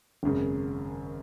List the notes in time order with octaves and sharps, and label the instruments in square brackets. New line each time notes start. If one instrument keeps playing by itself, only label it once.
[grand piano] G#1 F#2 C#3